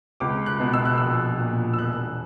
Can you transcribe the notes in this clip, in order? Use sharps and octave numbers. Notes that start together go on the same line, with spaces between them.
C#2 D6
F#6
B2
E6
F#6
A#1 E6
A#2
E6
E1 F#6